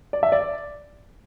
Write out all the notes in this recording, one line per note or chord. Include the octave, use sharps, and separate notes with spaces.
D5
E5
D5